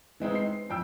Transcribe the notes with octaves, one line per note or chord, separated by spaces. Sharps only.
E3 G#3 C4 D#4
C7
F2 G5 E6